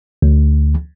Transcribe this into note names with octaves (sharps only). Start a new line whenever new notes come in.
D2